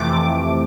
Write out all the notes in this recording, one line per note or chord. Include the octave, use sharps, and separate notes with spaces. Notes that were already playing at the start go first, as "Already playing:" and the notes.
Already playing: F2 C3 E3 A3 D6